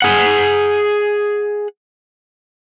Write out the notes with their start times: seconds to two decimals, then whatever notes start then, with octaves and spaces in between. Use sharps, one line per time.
0.02 G#4 F#5